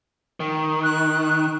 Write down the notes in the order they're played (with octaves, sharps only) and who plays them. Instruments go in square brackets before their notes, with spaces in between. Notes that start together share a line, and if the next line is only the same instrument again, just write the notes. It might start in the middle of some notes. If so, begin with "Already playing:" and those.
[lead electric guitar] D#3
[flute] F#6